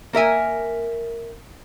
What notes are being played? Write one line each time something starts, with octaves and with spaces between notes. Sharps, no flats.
A#3 A#4 E5 G#5